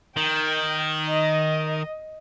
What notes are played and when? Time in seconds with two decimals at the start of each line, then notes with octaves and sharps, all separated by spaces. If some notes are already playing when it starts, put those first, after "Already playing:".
0.17 D#3 G5
1.09 D#5